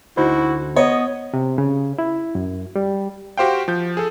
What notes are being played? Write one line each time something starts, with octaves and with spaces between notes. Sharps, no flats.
D2 D#4 E4 F#4 C5
B3 C#5 D#5
C3
C#3
E4
F#2
G3
F#4 G4 C5 F5 G5
F3 G6
G#4 A4